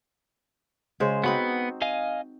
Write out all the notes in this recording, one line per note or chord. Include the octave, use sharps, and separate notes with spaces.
C#3 G#3 C5
B3 C4 D#4 F#4 B5
D#5 F5 G#5